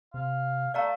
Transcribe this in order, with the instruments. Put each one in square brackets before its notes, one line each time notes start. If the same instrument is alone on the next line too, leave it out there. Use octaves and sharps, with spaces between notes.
[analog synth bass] C3 [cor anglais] F5
[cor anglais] A3 [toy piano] D5 F5 A#5